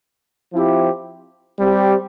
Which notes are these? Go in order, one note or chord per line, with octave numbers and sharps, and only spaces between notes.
F3 C4 E4 G4
G3 C4 G4